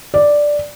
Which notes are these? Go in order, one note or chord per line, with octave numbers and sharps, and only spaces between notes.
D5